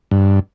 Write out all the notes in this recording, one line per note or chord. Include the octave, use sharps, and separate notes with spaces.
G2